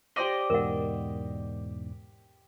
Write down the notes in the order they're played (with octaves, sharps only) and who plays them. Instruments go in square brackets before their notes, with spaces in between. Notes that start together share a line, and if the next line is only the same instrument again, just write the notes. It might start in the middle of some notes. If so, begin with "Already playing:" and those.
[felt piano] G4 C5 D#7 [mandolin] D5 D#5
[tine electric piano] E2 G#2 B2 [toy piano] A#4 F#5